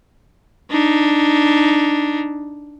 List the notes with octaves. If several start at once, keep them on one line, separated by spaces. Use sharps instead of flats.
D4 D#4